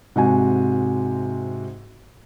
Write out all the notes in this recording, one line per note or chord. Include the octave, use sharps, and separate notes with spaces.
G#2 C3 F#4 G#5